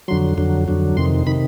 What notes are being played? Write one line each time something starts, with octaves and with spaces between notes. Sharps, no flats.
F2 D3 F#3 C6
F2 D3 F#3
F2 D3 F#3
F2 C3 D#3 C6
C3 D#3 B5